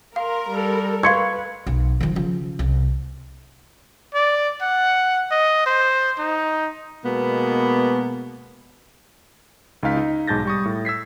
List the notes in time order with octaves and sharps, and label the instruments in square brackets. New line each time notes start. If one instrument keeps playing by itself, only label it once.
[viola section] A#4 [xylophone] F5 [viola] C6
[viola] G3 A4
[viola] B4 [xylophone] F5 C6 C#6 [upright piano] G#6 C#7
[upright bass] B1
D#3 F3
C#3 F3
C2
[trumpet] D5
F#5
D#5
C5
D#4
[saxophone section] B2 G#3 A#3 B3
[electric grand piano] C#2 D#4 F5 B6
D#4
B1 G#2 A5 G6 A6 A#6
G3 C#6 D#6
A2
E6 G#6 B6 C7